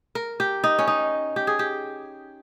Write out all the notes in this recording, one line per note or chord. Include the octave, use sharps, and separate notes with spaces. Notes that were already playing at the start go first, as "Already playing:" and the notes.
A#4
G4
D#4
C#4
D#4
G4
G#4
G4